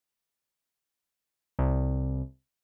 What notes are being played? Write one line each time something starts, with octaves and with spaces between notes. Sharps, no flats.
C2